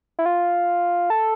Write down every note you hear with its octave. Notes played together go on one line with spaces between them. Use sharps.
E4
F4
A4